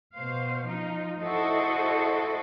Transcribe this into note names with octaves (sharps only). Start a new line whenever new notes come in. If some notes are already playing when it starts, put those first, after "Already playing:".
B2 C5 F5
F3 D#4 F4
E4 F#4 A4 C5 D#5